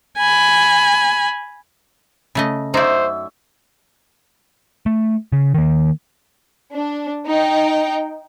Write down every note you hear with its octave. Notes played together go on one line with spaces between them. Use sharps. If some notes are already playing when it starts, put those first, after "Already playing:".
G#5 B5
C#3 A3 D#5
F#2 D#4 C5 D5 E5
A3
C#3
D#3 A#3
D4
D#4 G5